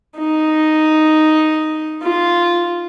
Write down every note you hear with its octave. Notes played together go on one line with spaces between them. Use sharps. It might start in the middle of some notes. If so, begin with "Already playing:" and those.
D#4
F4